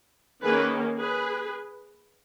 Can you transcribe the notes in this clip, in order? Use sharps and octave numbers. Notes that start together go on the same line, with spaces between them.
D#3 A#3 C#4 G#4 B4
G#4 B4